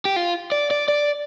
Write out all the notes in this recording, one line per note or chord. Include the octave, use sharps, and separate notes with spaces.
G4
F4
D5
D5
D5